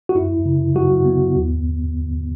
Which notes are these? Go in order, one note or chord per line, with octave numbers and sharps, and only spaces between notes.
F#4
F#2 E4
C#3
F#3 F#4
B3
D#2